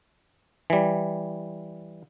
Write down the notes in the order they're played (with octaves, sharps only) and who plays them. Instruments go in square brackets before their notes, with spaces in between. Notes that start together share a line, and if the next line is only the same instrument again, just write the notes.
[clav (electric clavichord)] E3 G3